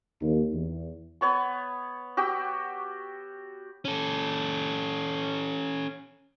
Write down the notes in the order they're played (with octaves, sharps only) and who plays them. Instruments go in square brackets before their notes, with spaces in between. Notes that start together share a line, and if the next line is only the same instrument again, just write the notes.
[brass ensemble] D#2
E2
[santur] B3 C#5 C#6
F#4 G4 G5 E6
[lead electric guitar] C#4 A4